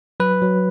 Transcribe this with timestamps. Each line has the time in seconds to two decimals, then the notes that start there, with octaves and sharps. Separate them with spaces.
0.20 F#3 B4
0.42 F#3